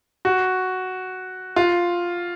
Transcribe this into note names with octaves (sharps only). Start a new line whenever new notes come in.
F#4
F4